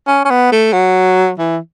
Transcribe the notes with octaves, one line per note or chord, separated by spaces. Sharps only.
C#4
C#4
B3
A3
F#3
E3